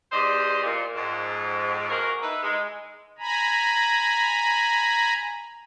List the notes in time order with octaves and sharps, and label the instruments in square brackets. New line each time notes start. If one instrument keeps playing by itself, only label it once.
[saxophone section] E2 G4 C5 D5 D#5
A#2
F2 G#2
A#3 F#4 G#4 A#4
D#4 E4 B4
G#3
[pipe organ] G#5 A#5 B5